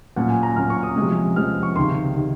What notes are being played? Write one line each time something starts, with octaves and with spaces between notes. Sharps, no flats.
A#2 F#3 C#4 F#5
G#5
A#5
A#2 F#3 C#4 F6
C#6
D#6
C3 F3 G#3 C#4
C3 F3 G#3 C#4 F6
C#6
C#2 C3 D#3 C6
C3 D#3